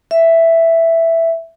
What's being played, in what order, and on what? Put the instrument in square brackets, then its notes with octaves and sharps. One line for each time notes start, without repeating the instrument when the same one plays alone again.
[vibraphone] E5